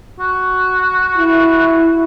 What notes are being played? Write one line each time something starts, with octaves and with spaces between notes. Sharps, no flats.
F#4
E4